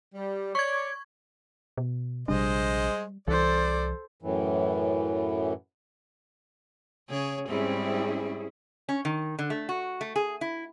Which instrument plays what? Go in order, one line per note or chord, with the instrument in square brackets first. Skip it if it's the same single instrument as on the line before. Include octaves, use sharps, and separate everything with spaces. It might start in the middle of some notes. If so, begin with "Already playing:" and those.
[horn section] G3
[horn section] C#5 D5 [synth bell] C#6 G#6
[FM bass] B2
[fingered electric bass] A#1 C3 D4 [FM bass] G3 [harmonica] G#3 C5 D#5
[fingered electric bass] C2 [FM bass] E3 [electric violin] A4 C5 [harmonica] D5
[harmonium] F#2 A2 E3
[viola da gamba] C#3 G#4 C#5
[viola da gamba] G#2 G3 C4 [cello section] C#4 E4 G#4
[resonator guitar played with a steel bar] C#4
D#3
D3
A3
F#4
A3
G#4
E4